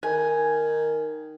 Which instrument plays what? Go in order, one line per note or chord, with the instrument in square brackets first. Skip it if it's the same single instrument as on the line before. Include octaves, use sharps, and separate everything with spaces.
[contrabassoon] D#3 [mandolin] G#5